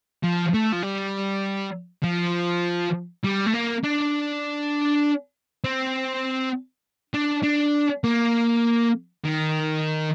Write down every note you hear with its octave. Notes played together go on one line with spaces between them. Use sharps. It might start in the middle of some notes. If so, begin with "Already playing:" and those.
F3
A3
F3
G3
F3
G3
A3
A#3
D4
C4
D4
D4
A#3
D#3